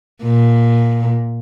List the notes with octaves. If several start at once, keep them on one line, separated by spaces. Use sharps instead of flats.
A#2